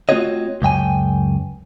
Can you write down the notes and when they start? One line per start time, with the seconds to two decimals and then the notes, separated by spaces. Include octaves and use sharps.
0.09 A3 C4 F4 F#4 C#5 D#5
0.62 C#2 F#2 G5 G#5